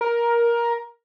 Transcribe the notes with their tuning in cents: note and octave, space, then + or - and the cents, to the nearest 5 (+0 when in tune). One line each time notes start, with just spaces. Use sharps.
A#4 +15